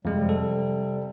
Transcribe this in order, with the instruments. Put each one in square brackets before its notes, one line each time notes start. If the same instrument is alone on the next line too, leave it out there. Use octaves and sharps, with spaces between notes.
[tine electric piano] F2 G#3 [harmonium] C3 G3
[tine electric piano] A4